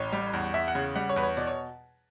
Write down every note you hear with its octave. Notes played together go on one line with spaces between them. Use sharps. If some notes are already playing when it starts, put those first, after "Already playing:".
Already playing: A1 C#5
G3
E2
E2 E5
F#5
C#3
G3 F#5
C#5
E2 B4
C#5
B2 D5
C#5